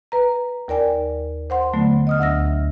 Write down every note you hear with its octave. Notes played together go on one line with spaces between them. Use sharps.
B4 A#5
D#2 A#4 D5 G5 G#5
C5 F#5 C6
D3 F#3 A3 B3
D#5 D#6 F6
D2 E5 E6 A#6